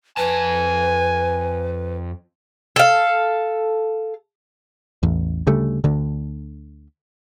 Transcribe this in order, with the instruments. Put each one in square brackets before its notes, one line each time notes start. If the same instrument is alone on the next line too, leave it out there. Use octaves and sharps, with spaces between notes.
[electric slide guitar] F2 A5 [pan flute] B4 [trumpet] G#5
[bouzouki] A4 F5
[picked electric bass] A1 E2
D2 C#3 G3 A3
D2 D3